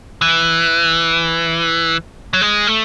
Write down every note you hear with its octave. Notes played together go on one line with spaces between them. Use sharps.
E3
F#3
G#3
A3